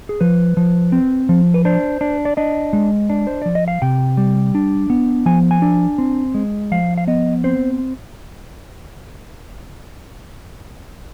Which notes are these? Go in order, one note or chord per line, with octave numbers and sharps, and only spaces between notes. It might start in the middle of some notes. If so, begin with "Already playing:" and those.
G#4
F3 B4
F3
C4
F3
B4
D4 C5
D4
D5
D4 D#5
G#3
D4
C5
F3 D5
D#5
F5
C3 G5
G3
D4
B3
F3 G#5
G#5
D4
C4
G#3
F3 F5
F5
B3 D#5
C4 C5